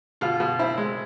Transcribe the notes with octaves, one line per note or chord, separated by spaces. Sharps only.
B2 F4
B2
C4 E4
G#3